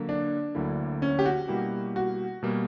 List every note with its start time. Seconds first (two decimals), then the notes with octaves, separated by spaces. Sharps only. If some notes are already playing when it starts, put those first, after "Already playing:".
Already playing: D3 F#3 A#3
0.09 D4
0.55 D2 D3 F#3 A#3 E4
1.02 C#4
1.19 G4
1.26 F#4
1.48 B2 G3 A#3 E4 G4
1.96 F#4
2.43 B2 G3 A#3